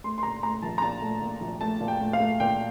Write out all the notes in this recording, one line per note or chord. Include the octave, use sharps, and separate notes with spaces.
A3 C6
C6
A#2 A#5
A3 A#5
A#1 A5
A#5
A#2 A5
A3
A#2
A#1
A3 A5
A#2
G5
A3
F5
A3
A#2 G5